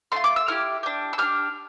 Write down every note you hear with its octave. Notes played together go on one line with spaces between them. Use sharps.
A3 D4 F4 C6
D6
E6
A3 E4 G4 F6
D4 G4
E6
D4 G4 F6